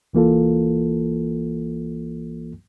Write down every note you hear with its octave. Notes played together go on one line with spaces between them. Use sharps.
C2 E3 A#3 F4 A4